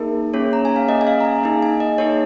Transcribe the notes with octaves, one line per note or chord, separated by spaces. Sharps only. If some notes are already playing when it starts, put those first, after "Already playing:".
Already playing: A#3 D#4 G#4 A#4
A#3 C#4 G#4 C#5
A#5
G#5
F5
A#3 C#4 G#4 D#5
G#5
F5
A#5
G#5
A#3 D#4 G#4 G#5
G#5
D#5
A#3 D#4 G#4 C#5